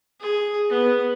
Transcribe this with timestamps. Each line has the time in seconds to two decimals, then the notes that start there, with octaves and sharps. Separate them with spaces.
0.20 G#4
0.70 B3